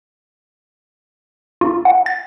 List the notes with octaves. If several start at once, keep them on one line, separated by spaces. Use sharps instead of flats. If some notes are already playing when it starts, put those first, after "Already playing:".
F4
F#5
A6